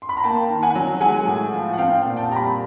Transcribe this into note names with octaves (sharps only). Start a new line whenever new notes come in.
C6
B5
A#5
A#3 G5 A5
D#3
F#5 G#5
F#3
G#3 F#5 G#5
A2
F3
F#5
C4 F5 G5
A#2
G5 A5
G3 A#5
A5 B5